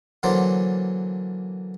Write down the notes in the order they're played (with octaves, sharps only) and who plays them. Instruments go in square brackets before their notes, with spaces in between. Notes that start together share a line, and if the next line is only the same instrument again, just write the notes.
[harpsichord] D3 E3 F#3 A#3 C5 D5